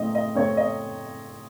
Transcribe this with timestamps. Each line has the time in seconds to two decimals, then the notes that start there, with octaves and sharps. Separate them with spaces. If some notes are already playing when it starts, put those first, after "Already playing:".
Already playing: A2 A3 C4 D#5
0.15 D#5
0.35 A3 C4 C#5
0.57 D#5